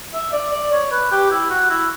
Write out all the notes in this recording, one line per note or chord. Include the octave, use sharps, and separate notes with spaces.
E5
D5
D5
C#5
B4
G4
E4
F#4
E4